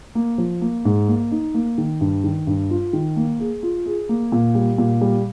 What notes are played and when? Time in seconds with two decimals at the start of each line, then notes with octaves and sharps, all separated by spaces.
0.15 A#3
0.38 F3
0.61 A#3
0.85 G#2
1.08 A#3
1.31 D#4
1.54 A#3
1.78 D#3
2.01 G2
2.24 D#3
2.47 G2
2.70 F4
2.93 D#3
3.16 A#3
3.39 G#4
3.63 F4
3.86 G#4
4.09 A#3
4.32 A#2
4.55 G3
4.78 A#2
5.01 G3